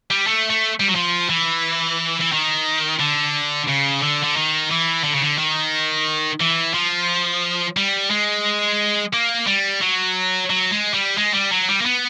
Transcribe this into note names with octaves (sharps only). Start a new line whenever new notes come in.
G3
A3
A3
G3
F#3
F3
E3
E3
D#3
D3
C#3
D3
D3
D#3
E3
D3
C#3
D3
D#3
E3
F3
G3
G#3
A#3
G3
F#3
F#3
G#3
G3
G#3
G3
F#3
G3
A#3
B3